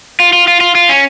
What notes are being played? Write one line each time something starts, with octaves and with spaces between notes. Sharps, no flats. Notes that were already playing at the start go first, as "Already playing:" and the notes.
F4
F4
F4
F4
F4
C#4